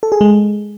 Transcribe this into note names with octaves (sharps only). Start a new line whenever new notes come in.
A4
G#4
G#3